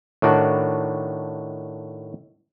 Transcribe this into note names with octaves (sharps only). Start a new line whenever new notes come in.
A2 D#3 D4 F#4